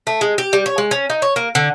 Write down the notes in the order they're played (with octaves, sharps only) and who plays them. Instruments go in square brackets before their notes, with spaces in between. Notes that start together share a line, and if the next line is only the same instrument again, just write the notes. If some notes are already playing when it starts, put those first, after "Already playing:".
[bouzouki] A3
G#3
G4
G3
C#5
G#3
C#4
D#4
C#5
A#3
D3